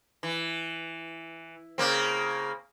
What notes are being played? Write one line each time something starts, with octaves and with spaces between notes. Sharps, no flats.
E3
C#3 A#3 C4